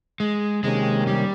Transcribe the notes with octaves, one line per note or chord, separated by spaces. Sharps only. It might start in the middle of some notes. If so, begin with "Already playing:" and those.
G#3
C3 D#3 G#3 A#3 C#4 G4
G3